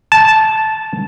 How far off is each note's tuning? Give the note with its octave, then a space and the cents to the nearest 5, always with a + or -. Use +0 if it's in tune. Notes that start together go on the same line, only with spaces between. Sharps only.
A5 -10